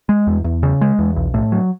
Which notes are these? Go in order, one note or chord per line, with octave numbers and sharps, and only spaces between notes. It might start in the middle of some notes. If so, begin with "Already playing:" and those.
G#3
E2
E2
C#3
G#3
E2
B1
A2
F#3